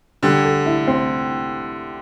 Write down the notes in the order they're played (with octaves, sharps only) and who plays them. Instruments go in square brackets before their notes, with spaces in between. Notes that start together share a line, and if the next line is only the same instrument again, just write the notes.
[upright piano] D3 [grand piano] G3
[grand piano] A4
E4
C4